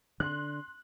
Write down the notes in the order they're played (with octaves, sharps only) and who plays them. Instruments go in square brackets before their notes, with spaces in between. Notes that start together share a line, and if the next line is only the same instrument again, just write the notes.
[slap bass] D3 [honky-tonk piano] C6 F#6